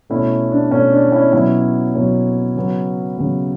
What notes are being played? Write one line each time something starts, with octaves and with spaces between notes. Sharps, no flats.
B2 A3 C#4 E4
D4
B2 A3 C#4
D4
C#4 E4
B2 F#3 B3 C#4 E4
B2 F#3 B3
C#3 F#3 B3
C#3 F#3 B3